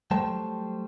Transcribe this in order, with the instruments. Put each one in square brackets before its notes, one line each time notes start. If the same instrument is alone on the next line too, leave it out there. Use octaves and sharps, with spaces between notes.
[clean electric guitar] F#3 G3 A3 C5 G5 A5